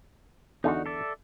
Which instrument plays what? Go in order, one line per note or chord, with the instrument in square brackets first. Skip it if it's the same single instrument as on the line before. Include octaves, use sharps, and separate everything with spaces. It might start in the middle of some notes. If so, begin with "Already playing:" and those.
[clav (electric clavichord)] E2 D3 [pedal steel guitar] D#4 F#4
[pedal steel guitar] A4 D5 E5